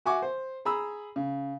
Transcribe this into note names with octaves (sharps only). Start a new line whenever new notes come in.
F#4 E5 F#5 G#5 C#6 D6
C5
G#4 A#5 B5 E6
C#3